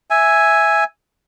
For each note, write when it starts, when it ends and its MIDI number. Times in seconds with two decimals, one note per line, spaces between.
0.10 0.84 76
0.10 0.84 80